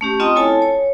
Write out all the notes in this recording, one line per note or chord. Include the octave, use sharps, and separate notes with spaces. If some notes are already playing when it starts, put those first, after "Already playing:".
A3 C#4 G4
C4 F4 D#5 G5 A#5 D#6
E4 A4 C#5 G#5 A5
C#5